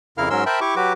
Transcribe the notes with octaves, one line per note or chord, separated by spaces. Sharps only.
F2 C#3 E4 A#4 F5 F6
G#2 F#3 C#4 A#4 C6 E6
A#4 C5 E5 G5 A5 B5
E4 G4 C#6 D6
F#3 F#4 G4 B4 D6